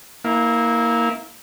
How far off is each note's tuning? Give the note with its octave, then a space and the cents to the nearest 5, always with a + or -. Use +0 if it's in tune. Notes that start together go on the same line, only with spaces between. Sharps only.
A#3 +0 E4 -25 F5 +0